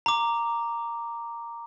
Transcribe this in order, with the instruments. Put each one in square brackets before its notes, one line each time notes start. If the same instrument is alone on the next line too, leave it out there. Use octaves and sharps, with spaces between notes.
[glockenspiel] A#5 D6